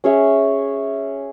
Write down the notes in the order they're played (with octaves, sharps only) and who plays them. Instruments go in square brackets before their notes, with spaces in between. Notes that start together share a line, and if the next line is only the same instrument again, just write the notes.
[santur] C#4 G#4 C#5 E5